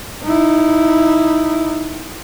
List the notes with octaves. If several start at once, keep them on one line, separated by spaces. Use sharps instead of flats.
D#4 E4